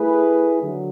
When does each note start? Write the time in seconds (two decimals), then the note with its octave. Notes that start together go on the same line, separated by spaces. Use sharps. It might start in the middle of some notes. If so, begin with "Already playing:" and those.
Already playing: A3 E4 G#4 B4
0.61 D3 F#3